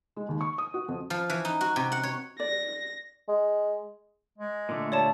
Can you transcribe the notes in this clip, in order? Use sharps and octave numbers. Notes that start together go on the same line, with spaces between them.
G#3
D#2
C#6
D#6
F#4
F2
F3
E3
D#4
F#4
C3
F#5
C#5
D5 A#6
G#3
G#3
A#2 D3 A3
D#2 C#5 D5 A5